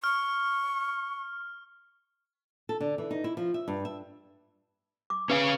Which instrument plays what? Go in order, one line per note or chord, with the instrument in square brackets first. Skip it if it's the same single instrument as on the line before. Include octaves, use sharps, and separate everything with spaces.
[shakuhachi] C#6 [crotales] F6
[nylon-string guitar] A4
D3
E3
D#4
E4
F3
E5
G2
E5
[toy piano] D6
[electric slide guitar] C#4 F5 G#5 [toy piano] B4